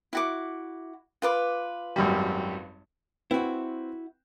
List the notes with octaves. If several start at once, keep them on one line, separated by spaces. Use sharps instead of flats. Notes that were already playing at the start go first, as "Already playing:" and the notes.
E4 F#4 D6
F4 B4 D6
G#1 F#2 G3
C4 E4 F#4 B4 G5